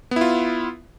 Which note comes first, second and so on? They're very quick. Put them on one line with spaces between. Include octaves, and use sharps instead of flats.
B3 E4 F4